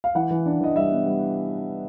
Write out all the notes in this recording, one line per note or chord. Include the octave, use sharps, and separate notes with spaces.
F5
E3 F#5
E3
D4
E3 D#5
G3 E5
B3
G3